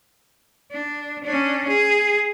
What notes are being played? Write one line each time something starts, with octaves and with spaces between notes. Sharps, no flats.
D4
C#4 D4
G#4